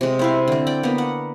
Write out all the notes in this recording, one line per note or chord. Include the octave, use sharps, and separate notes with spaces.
C3 G#3
C4 E4 F5
D3 C4
D5 G5
A#3 B3
F#5